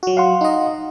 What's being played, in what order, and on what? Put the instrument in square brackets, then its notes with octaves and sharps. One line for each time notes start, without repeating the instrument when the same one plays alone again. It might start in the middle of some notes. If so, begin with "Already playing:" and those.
[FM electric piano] F#3 F#4
[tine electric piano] F5 F#5 C6
[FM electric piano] D#4 D#5